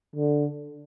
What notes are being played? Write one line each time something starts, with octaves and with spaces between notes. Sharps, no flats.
D3